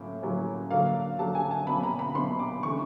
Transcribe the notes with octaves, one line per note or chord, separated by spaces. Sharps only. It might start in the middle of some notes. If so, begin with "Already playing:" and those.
Already playing: A2 F#3 A#3 C#4
A2 F#3 A#3 C#4
D3 F#3 A#3 F5
D3 F#3 A#3 A5
G#5
A5
B2 F#3 A#3 C#4 B5
A#5
B5
B2 F#3 A#3 C#4 C6
D6
C3 E3 A3 D4 C#6